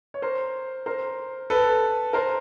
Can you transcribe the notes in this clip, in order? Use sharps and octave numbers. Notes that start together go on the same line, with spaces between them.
C#5
A#4 C5
A#4 C5
A4 B4
A#4 C5